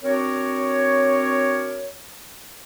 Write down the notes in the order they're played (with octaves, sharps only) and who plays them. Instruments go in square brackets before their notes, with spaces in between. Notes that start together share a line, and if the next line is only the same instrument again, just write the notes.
[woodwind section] C4 D4 F#4 A#4 C#5